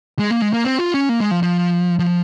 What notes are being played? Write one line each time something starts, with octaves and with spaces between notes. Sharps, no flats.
G#3
A#3
G#3
A#3
C4
F4
C#4
A#3
G#3
F3
F3
F3